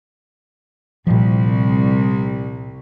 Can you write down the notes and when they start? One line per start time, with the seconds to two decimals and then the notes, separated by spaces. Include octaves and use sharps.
1.07 C2 A#2 F3